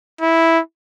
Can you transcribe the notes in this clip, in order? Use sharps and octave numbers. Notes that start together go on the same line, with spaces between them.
E4